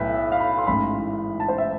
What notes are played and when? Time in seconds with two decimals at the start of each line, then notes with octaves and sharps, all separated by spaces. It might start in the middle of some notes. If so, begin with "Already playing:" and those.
Already playing: B1 A2 B3 B4 E5
0.32 F5
0.40 B5
0.58 C6
0.67 A1 G#2 E3 B5
1.40 A5
1.48 C5
1.58 E5